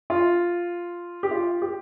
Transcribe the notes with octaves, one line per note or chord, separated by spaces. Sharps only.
F4
G4
F4
G4